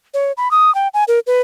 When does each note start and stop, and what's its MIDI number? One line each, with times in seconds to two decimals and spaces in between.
0.14 0.32 73
0.37 0.51 83
0.51 0.73 87
0.75 0.88 79
0.94 1.04 80
1.08 1.19 70
1.27 1.42 71